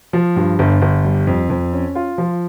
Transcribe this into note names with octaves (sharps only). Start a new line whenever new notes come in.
F3
G2
G1
G1
G3
F2
F2
C#4
F4
F3